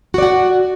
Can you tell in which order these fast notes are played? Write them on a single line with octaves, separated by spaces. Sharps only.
F#4 D5 F#5